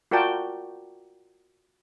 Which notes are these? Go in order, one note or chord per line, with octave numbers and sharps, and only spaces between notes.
F4 F#4 A#4 D5 G5 A5